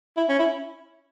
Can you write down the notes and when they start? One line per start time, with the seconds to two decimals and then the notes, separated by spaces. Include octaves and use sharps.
0.17 E4
0.29 C#4
0.39 E4